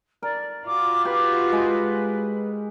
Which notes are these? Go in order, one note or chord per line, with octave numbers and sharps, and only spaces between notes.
A#4 D5
F4 F#4 D6
G4 B4
G#3